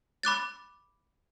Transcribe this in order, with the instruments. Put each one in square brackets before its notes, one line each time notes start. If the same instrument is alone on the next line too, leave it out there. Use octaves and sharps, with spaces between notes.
[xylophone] B5 D6 F#6 A6